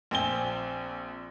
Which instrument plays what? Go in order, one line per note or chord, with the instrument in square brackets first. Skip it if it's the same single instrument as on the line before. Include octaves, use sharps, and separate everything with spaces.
[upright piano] A#1 C4 G#5 G7